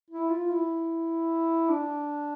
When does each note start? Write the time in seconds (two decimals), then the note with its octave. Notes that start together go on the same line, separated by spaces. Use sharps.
0.10 E4
0.30 F4
0.50 E4
1.70 D4